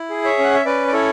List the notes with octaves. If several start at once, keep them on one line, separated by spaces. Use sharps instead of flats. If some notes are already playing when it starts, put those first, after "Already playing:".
Already playing: E4
G#4
C#5 E5
C#4 F#5
E5
C#4 B4 D5
D5
E4 A4 C#5